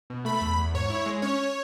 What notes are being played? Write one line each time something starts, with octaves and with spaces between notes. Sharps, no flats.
B2
A3 B5
E2
E2
G#2 C#5
E4
G#3
C#4 C#5